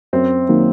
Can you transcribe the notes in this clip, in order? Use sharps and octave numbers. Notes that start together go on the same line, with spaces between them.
F#2 C4
D#3 F#3 A#3 D#4